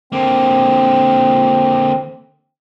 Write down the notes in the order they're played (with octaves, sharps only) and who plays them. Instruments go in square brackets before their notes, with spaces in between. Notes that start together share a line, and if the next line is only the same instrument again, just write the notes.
[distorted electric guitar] D3 A#3 [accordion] C4